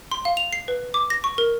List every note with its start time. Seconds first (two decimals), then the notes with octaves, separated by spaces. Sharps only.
0.11 C6
0.25 F5
0.37 F7
0.53 C7
0.68 B4
0.94 D6
1.10 A#6
1.24 C#6
1.38 A#4